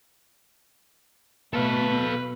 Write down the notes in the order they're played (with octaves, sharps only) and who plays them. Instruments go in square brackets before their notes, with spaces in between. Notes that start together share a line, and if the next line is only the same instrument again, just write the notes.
[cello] B2 [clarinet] A3 [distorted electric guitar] A4 F5 [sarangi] B4